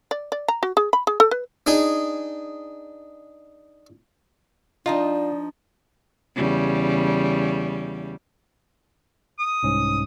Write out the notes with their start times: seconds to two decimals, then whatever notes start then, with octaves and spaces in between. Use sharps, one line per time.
0.11 D5
0.32 D5
0.48 A#5
0.63 F#4
0.77 G#4
0.93 B5
1.07 G#4
1.20 A4
1.31 B4
1.67 D4 D#4 G#4
4.86 F3 D4 D#4 F4 D5 D#5
6.36 E2 C#3 G3
9.39 D#6
9.63 C2 G#2 C#4